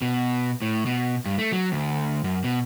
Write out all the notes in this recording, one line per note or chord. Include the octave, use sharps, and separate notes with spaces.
B2
A2
B2
G2
A3
F#3
D2
F#2
B2